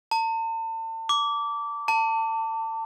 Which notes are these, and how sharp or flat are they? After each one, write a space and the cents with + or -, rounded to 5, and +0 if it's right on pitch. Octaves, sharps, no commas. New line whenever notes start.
A5 +40
D6 -20
A5 +30